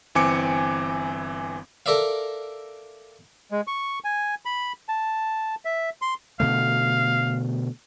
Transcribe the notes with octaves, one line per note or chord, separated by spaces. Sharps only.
G1 E3 C4 G#5 D6 C#7
A4 A#4 D5 E5 F5
G#3
C#6
G#5
B5
A5
E5
C6
B2 D3 A3 F5